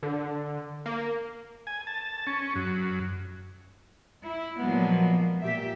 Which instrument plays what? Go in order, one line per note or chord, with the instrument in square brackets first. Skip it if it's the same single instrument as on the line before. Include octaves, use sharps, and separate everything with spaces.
[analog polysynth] D3
A#3
[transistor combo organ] G#5
A5
C#4
F#2
[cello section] E4
A#2 F3 F#3 G#3 A#3 B3
A#2 G4 E5